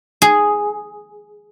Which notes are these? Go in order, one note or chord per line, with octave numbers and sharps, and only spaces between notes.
G#4